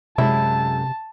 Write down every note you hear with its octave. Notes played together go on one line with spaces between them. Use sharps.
F#2 C3 G#3 E4 A5